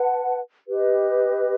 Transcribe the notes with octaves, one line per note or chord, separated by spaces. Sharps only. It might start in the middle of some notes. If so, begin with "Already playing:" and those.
Already playing: B4 F#5 A5
G4 B4 D#5